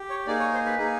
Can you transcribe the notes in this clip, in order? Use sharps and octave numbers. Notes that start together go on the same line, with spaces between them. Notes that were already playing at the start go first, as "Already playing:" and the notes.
Already playing: G4
C#5
A#3 D#4 G#4 D5
C#5
C5
B4
A#3 D#4 G#4